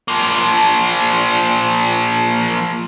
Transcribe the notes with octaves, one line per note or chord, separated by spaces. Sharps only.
F3 A#3